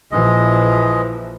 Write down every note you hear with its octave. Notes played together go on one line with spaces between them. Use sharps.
A#1 E3 F3 G#3 D#5